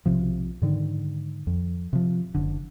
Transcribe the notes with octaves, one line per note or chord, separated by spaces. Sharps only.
B1 C3 F3
G#2 D3 D#3
F2
C3 F3
F#1 D3